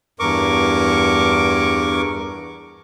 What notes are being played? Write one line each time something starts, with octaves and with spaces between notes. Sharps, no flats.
E2 G2 A#4 C#6 D6